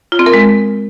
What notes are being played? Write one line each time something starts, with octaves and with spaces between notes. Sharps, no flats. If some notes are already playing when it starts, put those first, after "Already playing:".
F4
C4
A#4
G#3